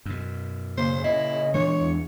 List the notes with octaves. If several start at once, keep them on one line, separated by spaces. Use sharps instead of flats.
F#2 B2
C#3 A#3 C5
A#2 E4 D#5
A#2 E3 G#3 D4 C#5 C#7
E2